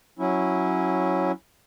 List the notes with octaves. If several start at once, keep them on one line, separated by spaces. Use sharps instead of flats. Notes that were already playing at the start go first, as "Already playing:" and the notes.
F#3 C#4 E4